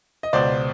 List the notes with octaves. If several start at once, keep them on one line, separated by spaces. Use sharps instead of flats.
D#5
C#2 B2 C5 D5